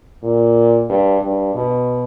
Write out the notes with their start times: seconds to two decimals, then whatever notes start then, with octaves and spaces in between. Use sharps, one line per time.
0.23 A#2
0.89 G2
1.21 G2
1.55 B2